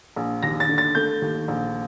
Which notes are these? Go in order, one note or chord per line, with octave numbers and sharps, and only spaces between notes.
A#1
D#2 A#6
A6
D3
A6
A3 G6
D#2
A#1